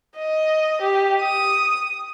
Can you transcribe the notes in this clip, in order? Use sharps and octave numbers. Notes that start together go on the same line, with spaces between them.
D#5
G4
D#6